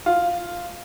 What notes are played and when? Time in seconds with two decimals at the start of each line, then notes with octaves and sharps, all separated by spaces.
0.06 F4